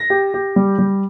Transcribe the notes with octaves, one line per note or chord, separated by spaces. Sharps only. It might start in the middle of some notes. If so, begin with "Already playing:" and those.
Already playing: A#6
G4
G4
G3
G3